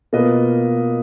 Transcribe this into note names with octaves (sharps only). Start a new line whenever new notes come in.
B2 A#3 F4 B4 D#5